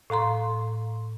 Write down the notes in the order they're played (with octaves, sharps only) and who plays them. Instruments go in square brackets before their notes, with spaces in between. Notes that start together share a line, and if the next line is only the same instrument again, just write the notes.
[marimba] A2 F5 A#5 C6